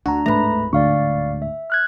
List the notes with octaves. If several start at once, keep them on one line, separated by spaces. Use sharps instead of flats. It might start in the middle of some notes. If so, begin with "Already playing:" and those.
D2 D4 F#4 A#5
D1 G#2 A3 B4 A#5 B5
D2 D5 F5 C#6
E5
F6 F#6 G#6